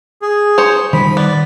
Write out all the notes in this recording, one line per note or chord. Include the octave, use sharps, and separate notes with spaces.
G#4
C5 C#5
D#3 F3 G3 B5
B3 D5